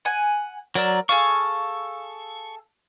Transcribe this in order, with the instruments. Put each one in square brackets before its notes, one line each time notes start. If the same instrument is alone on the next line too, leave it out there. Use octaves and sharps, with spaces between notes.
[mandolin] F#5 G#5
[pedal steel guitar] F#3 D5 [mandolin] A#4 E6
[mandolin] G#4 A4 F5 [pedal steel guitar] C#6